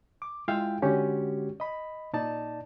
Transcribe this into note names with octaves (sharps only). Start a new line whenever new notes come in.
D6
G#3 E4 F4 E5 F5 G5
D3 G#3 C#4 F#4 G4
D#5 B5
A#2 D#4 D5 A5